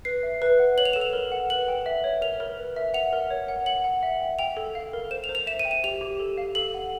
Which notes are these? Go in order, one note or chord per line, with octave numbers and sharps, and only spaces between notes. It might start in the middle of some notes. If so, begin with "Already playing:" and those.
B4 C7
E5
B4
F#5
C#5 F#7
F7
A4 E7
F7
A#4
F#5
B4 F#7
G5
E5
C#5
A#4 F7
A#4
B4
E5
F#5 F7
A#4
C#5
F#5
F#5 F#7
F#5
E5
G5
G5 F7
A4
F5
A#4
C5 E7
F7
C5
F7
E5 E7
D#7
G5
E7
G4 F7
G4
A4
F5
A4 F#7
F#5